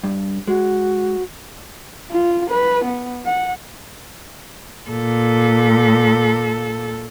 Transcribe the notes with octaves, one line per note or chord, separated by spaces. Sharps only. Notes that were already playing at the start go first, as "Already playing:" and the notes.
G2
G#3 F#4
F4
B4
B3
F#5
A#2 A4